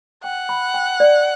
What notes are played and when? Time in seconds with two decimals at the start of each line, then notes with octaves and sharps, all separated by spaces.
0.24 F#5 G5
0.49 B5
0.74 G5
1.00 D5